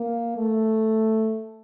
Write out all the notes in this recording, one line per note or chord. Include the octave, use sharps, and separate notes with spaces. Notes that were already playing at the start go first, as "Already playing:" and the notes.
Already playing: A#3
A3